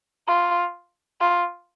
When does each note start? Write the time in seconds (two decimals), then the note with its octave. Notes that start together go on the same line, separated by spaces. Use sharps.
0.28 F4
1.21 F4